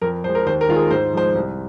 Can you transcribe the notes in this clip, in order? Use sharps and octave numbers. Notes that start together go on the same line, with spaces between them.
F2 A#4
F3 G#3 C5
A#4
D#2 C5
A#4
D#3 G#3 F4
G#4
G#2 C5
F3 G#3 C5
C2